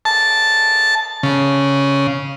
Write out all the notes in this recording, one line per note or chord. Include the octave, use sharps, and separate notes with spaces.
A5
C#3